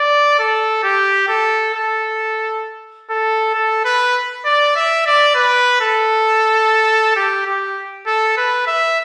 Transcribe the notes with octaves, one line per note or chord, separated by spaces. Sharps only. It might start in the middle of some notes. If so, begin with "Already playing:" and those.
Already playing: D5
A4
G4
A4
A4
A4
A4
B4
D5
E5
D5
B4
A4
G4
G4
A4
B4
E5